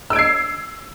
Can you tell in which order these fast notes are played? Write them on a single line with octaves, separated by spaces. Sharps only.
E6 D7 G#6 C7